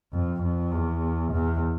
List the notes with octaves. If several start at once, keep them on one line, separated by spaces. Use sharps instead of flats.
F2
F2
E2
E2